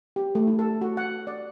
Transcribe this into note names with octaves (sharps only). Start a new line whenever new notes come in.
G4
A3
E4
A4
F#4
F#5
D5